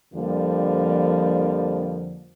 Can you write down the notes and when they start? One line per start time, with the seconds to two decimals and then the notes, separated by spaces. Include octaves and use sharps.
0.13 F2 D3 F3 G3 A#3